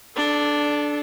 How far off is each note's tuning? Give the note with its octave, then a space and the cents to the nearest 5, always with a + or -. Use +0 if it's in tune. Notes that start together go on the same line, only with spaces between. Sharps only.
D4 +0 A4 -30